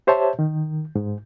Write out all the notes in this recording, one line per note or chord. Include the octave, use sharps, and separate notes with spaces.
G4 C5 C#5 E5 A5
D#3
G#2